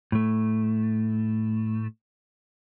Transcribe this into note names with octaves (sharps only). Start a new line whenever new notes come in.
A2 A3